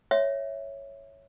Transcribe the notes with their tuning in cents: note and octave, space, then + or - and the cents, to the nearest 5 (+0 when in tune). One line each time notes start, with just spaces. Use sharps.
C#5 +0 E5 +0